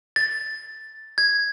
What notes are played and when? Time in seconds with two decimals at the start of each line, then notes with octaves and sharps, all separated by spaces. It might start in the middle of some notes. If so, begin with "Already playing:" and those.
0.16 A6
1.18 G#6